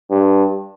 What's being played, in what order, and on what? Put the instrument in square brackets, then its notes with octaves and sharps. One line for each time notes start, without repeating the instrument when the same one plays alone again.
[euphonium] G2